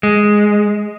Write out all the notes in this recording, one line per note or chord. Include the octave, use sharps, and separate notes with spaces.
G#3